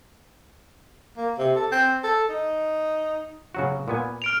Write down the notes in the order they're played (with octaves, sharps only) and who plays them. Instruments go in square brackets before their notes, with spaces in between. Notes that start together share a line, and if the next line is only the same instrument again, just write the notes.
[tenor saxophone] A#3
C3
A4
C4
A4
D#4
[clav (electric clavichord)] C#3 F#3 F#4
A#2 B3 G#5
[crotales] F6 D7 F7